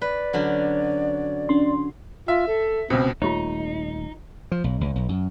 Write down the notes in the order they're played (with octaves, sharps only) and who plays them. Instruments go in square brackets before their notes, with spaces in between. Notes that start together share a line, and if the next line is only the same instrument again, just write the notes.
[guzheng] B4 [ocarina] D5
[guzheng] D3 F#3 C#4
[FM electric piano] C#4 D4 C6
[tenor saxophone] F4 [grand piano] E5
[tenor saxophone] A4
[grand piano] C#2 B2 [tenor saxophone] C4
[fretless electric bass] D#1 A3 [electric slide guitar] D#4 [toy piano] F4 G4 C#5
[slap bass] F3
B1
C#2
B1
F#2